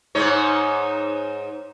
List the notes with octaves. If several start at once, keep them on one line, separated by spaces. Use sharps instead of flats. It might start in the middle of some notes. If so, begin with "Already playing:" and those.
G#2 D#4 C#5